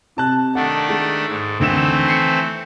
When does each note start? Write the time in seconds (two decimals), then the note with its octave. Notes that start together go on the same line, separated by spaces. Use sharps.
0.17 C3 A5 F#6
0.55 D#3 A3 D4 F#5
0.89 G#3
1.28 G#2
1.60 D2 D#3 E3 A3 C4 E7
2.08 C7 C#7